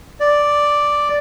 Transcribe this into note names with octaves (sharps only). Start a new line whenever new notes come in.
D5